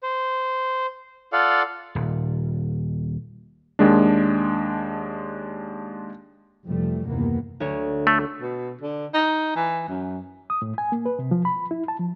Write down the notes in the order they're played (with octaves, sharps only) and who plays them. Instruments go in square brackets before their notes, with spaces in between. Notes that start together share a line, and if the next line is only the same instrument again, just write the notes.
[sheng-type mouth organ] C5
F4 A4 D5 F5 F#5
[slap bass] D#1
[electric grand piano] D#2 G#3 D4
[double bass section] F1 C3 E3 F3 G3 A3
F#1 D#2 C3 E3 A#3 B3
[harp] D2 C#5
[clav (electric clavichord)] A3
[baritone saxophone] B2
D3
D#4
E3
F#2
[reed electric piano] D#6
A2
G#5
A#3
B4
C3
F3
B5
E4
A5
F3